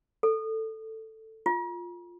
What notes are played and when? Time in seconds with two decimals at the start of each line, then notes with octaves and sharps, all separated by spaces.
0.23 A4
1.46 F4